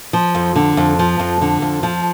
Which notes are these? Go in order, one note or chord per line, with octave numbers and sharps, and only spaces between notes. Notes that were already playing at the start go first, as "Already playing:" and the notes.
F3
F2
D3
F2
F3
F2
D3
F2
F3